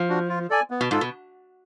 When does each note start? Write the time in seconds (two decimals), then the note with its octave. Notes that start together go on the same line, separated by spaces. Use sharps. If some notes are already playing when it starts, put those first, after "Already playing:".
Already playing: F3
0.09 D4 F#4
0.29 F4
0.50 A4 D5 G#5
0.71 B3
0.81 B2
0.91 G#2 F4 A4
1.01 B2